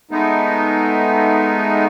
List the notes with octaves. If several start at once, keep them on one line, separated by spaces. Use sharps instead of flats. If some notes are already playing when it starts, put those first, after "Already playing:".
G#3 A3 B3 D#4